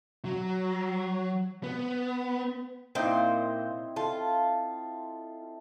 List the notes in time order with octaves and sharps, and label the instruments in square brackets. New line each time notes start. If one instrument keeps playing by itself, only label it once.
[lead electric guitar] F#3
B3
[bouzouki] A#2 C5 [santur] C4 D#4 E4
[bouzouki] F4 [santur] A4